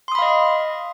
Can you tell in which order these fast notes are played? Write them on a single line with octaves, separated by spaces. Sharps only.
C6 D#6 B5 F5 D#5